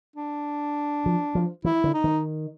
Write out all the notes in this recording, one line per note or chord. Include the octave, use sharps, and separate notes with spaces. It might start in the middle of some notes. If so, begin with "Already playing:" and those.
D4
F3
F3
E3 E4
D3
D#4
D#3